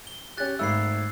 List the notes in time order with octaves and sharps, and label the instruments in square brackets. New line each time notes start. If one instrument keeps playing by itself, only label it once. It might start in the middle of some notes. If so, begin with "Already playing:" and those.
[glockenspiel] G7
[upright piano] C#4 G4 [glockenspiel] F#6 A6
[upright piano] G#1 A3 [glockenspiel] E6 C7